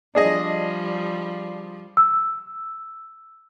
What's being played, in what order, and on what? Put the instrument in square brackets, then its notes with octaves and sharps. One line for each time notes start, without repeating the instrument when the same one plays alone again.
[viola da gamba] F3 G3 [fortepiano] D4 G#4 D#5
[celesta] E6